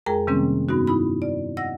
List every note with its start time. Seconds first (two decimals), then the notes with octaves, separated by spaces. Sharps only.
0.06 F2 G#3 G#4 A#4 G5 A#5
0.27 C3 D#3 G3 A#3 C4 C#4
0.69 G2 B3 D#4 F#4
0.87 D#4 E4 B5
1.22 D5
1.57 D#5 F#5 E6 A#6